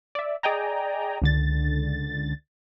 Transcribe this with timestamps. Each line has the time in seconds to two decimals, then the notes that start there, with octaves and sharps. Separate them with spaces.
0.15 D5 E5
0.43 G#4 D5 D#5 G5 G#5 A#5
1.22 C#2 D3 A6